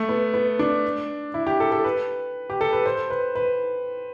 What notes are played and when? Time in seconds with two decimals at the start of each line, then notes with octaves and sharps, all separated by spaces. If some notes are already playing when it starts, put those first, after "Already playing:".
Already playing: A3
0.09 B3
0.34 B3
0.59 D4
1.34 E4
1.47 G4
1.60 A4
1.72 A4
1.84 B4
2.50 G4
2.61 A4
2.73 B4
2.86 C5
3.10 B4
3.35 B4